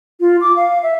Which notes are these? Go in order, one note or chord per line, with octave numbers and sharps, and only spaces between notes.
F4
D6
F5
E5